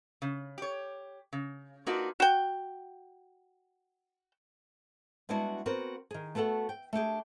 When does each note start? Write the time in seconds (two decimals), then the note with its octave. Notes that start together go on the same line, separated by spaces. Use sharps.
0.22 C#3
0.58 G4 C#5
1.33 C#3
1.87 A#3 D4 D#4 F4 F#4 B4
2.20 F#4 G5
5.29 G3 G#3 B3 D4 E4 F#4
5.66 B3 C4 F#4 A#4
6.11 D#3 G#4
6.35 A3 B3 F#4 A4 F#5
6.69 G5
6.93 A3 D4 G4 G#4